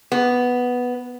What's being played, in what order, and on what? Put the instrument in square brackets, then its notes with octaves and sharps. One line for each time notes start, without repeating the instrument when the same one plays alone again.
[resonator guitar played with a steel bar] B3